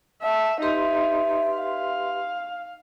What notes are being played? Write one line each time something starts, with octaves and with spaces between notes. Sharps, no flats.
E5 A5
D#4 G4 B4 E5 C6
F5